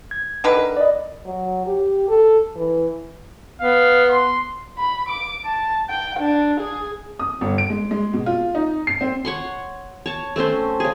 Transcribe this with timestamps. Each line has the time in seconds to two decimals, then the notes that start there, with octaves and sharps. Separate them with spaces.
0.11 G#6
0.44 D3 D#3 B4
0.57 A#4
0.77 D5 D#5
1.26 F#3
1.67 G4
2.08 A4
2.56 E3
3.61 B3 F5
4.10 C6
4.78 B5
5.09 D6
5.45 A5
5.90 G5
6.19 D4
6.60 G#4
7.19 D#6
7.41 G1
7.58 D7
7.70 G#3
7.91 G#3
8.13 B2
8.26 F4
8.55 D#4
8.87 C7
9.01 C4
9.25 C#5 F#5 C6
10.06 C#5 A5
10.36 A3 C4 C#4 C5
10.80 C#3 G#4